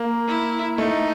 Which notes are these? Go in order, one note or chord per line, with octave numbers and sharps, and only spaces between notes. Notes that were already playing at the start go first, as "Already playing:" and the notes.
Already playing: A#3
E4
A3 D#4